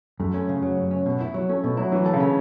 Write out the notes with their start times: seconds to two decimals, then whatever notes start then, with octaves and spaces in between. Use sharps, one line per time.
0.19 F#2 A3
0.34 C#4
0.49 C#3
0.62 F#3
0.77 F#2
0.91 C#4
1.06 B2
1.21 E4
1.34 F#3
1.49 A3 C#4
1.64 B2
1.77 F#3 E4
1.92 E3 F#3
2.06 A4
2.13 C#3
2.20 C#4